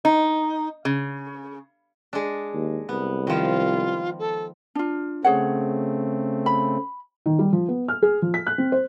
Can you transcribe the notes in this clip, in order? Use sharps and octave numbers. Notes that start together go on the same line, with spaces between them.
D#4
C#3
G#3 D4
D#2
C2 B3
D#3 F3 F4
A4
D4 F4
C#3 A3 C4 G#4 C#5 F#5
B5
D#3
G3
F3
B3
F6
G#4
F3
B6
F#6
C4
C5